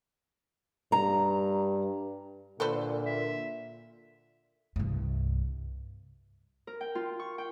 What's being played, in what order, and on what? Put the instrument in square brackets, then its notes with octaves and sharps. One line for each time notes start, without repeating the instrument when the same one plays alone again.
[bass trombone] G2 [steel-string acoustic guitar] A#5
[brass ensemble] A#2 [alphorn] D3 [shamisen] A4 B4 C5
[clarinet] E5
[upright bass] C2 G2
[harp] A#4
G5
F4
C#6
G5